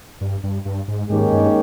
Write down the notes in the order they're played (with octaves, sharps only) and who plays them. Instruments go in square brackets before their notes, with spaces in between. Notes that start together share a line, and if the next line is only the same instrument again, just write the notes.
[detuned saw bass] G2
G2
G2
G#2
[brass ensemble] D#2 D#3 G#3 C#4 G4 [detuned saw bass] G#2
[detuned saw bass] G2